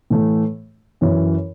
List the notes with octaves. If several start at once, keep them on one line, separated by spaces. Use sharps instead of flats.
A2 E3 A3
F#2 E3 C#4 E4